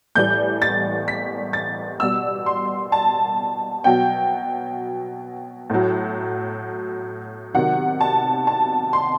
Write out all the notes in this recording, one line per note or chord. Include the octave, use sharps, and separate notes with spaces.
A2 E3 G3 G6
A6
B6
A6
B2 G3 E6
C6
A5
B2 F#3 G5
A2 F#3
C3 D#3 F#3 F#5
A5
A5
C6